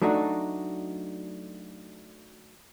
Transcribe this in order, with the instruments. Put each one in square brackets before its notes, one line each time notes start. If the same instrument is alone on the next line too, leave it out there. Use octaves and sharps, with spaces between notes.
[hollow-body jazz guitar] F#3 A3 D4 D#4 F#4